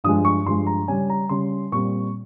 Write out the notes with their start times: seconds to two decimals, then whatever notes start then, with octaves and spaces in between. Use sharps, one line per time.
0.04 G2 F3 G#3 D#6
0.25 C#6
0.46 G2 F3 G#3 C6
0.67 A#5
0.88 C#3 G3 C#4 G#5
1.10 A#5
1.29 C#3 G3 C#4 C6
1.72 A#2 G3 C4 C#6